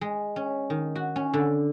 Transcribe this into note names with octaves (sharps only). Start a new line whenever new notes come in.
G#3
C#4
D#3
F#4
C#4
D3